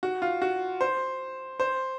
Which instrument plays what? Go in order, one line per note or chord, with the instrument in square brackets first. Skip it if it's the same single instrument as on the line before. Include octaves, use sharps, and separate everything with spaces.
[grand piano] F#4
F4
F#4
C5
C5